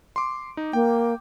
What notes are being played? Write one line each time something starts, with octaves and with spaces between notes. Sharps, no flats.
C6 D6
D#4
A#3 G5